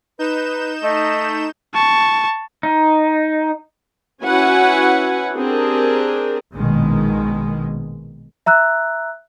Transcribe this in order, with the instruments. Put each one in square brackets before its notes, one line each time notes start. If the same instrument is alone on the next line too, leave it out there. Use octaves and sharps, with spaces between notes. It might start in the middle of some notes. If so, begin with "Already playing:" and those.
[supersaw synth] D#4 G6 E7 [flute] B4
[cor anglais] A3 [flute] D#5
[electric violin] A5 C#6
[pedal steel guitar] D#4
[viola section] C#4 E4 F#4 B4 F#5 G#5
C4 D4 G4 G#4 A#4
[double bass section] A#1 B2 D#3 G#3
[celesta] E5 A#5 E6 F#6